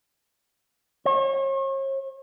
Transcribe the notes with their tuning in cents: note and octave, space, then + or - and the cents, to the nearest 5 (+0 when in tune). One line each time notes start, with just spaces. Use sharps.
C#5 -40